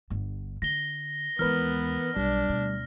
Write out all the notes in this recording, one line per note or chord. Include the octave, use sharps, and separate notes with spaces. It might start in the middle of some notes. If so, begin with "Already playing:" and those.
G1 D3
D3 A#6 G7
D#2 E3 G#3 B3 A#4 B4 F6
B1 G3 D4
D2 B2